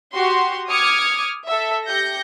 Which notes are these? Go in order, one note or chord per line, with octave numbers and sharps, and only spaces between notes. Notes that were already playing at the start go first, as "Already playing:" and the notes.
F#4 G4 C6
D6 D#6 F6 G#6 C#7
A4 E5
G4 G6 A#6 C#7